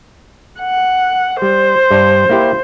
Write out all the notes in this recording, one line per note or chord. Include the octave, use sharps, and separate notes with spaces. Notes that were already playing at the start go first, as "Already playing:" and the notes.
F#5
G3 C5
G2 D5 A5
A#3 E4 G4